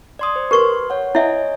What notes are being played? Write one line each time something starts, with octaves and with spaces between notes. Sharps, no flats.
D5 C6 D#6
C5
G4 A#4 B4 C6 C#6
C#5 F#5
E4 C#5 D#5 E5 G#5